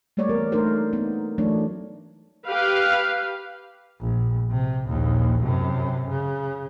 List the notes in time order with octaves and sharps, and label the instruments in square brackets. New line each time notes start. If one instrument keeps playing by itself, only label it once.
[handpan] G3 A3 A#3 C#5 D5
E3 A#3 B3 A#4
A3 A#3 D4 D#4 A#4 C5
A#3 B3 D#4
E3 F#3 A3 D4 D#4 C#5
[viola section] G4 B4 F5
[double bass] A#1
C3
A#1 D#2
F#2 C3
C#3